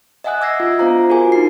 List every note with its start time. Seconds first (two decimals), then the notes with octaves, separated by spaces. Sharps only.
0.24 D#5 E5 F#5 G#5 D#6 F#6
0.41 D6 E6 G#6 A#6 C7
0.60 F4
0.79 B3 D4 F4 C5 F5 A#5
1.09 F4 F#4 G#4 A#4 G#5 D6
1.32 D#4 C7